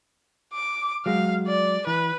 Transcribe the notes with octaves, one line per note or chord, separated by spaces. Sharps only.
D6
F#3 G#3 F5
D5
E3 B4